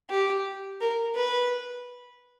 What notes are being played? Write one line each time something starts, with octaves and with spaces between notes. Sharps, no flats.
G4
A#4
B4